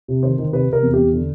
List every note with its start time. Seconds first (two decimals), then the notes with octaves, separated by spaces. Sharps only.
0.08 C3
0.23 D#3 C5
0.38 D#3
0.52 C3 B4
0.68 C3 A#4
0.82 E2
0.94 E2 G4
1.13 D3